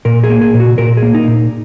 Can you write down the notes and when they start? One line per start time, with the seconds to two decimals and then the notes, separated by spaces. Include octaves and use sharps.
0.05 A#2 A#4
0.24 G#4
0.30 A#3
0.41 G#4
0.54 A#2
0.60 F#4
0.78 A#2 A#4
0.97 G#4
1.03 A#3
1.14 D#4
1.28 A#2